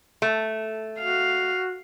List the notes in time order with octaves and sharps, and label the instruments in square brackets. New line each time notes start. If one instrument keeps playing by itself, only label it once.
[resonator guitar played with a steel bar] A3
[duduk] F#4 [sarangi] F5